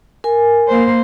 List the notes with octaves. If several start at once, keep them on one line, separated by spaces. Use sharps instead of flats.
A#4 G#5
A#3 C5